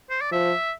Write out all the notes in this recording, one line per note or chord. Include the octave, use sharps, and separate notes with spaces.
C5
D5
F3 E5